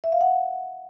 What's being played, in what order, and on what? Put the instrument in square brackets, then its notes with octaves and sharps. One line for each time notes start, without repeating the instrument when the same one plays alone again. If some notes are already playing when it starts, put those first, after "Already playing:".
[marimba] E5
F5
F#5